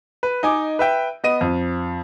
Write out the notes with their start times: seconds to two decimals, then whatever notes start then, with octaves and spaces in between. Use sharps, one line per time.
0.23 B4
0.43 D#4 D#5 G#5 D6
0.79 B4 E5 G5
1.24 B3 D#5 D#7
1.41 F2